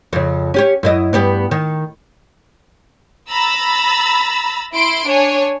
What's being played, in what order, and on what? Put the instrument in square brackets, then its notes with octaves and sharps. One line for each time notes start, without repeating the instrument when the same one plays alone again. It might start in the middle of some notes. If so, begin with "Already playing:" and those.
[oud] F2 C#3
C#4 G4 C#5
F#2 E4 D#5
G2 B3 G4
D#3
[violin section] A#5 B5 E6 A6
E4 C6 D7
D4 C#5 G#5